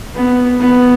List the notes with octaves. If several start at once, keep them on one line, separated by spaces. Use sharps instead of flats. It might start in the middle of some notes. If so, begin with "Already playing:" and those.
B3
B3